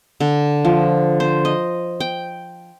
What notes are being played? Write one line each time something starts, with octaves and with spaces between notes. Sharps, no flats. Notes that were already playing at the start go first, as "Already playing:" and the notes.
D3
F3
C5
D#5
G5